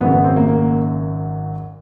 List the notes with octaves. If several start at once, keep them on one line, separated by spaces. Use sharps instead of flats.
G#1 F#2 C#3 F#3 B3
B3
C4
A#3
A#3